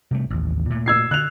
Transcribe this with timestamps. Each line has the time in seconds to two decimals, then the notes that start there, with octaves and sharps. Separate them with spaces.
0.11 C3 G3 A3
0.30 A1 D#2
0.70 A#2 A3
0.86 E6 G#6 C7
1.11 D3 F#6 F7